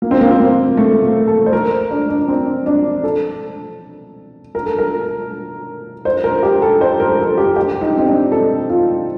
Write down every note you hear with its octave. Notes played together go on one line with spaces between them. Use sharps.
A#3
C4
A#3
C4
A#3
A3
A#3
A4
C5
A#4
D4
D4
D4
C4
D4
A4
A#4
A4
A#4
C5
A#4
G4
A4
C5
A#4
A4
G4
G4
D#4
C4
D4
A4
F4